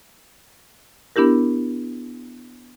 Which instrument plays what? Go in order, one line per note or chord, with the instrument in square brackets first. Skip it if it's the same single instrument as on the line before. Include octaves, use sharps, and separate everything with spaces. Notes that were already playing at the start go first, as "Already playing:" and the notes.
[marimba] B3 D4 E4 G4 A#4